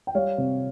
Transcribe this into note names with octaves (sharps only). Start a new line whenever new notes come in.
G5
G3 C#5 F5
C3